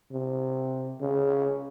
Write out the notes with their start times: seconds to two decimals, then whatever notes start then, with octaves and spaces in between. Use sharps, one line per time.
0.12 C3
1.00 C#3